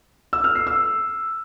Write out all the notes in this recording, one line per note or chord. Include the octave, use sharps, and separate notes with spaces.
E6
F6
C7
E6